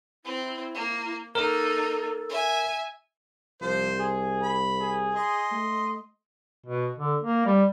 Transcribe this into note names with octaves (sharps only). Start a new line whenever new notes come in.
C4 E4
A#3
A#3 D#4 A4 A#4
E5 G#5
C2 F3 C5
G#4
B5
G#4
D#5 C6
A3
B2
D3
A#3
G3